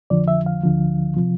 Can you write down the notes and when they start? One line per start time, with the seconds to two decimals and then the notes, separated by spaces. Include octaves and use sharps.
0.10 F2 D3 F3 D5
0.28 E5
0.46 F5
0.64 D2 D3 F3
1.17 C3 F3